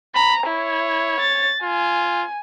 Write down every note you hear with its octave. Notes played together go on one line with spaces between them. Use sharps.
A#5 B5
E4 C#5
A6
F4 G#5